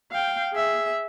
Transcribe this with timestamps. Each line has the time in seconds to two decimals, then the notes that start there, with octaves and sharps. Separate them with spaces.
0.12 F5 G5
0.53 G#4 E5